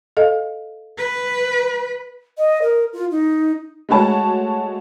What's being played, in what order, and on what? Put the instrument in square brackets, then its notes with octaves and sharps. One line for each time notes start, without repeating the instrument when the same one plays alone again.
[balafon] A4 D#5 F5
[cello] B4
[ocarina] D#5
A#4
F4
D#4
[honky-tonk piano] G#3 A3 F#4 C#5 A5